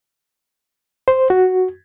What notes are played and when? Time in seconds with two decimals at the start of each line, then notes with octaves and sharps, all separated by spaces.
1.08 C5
1.30 F#4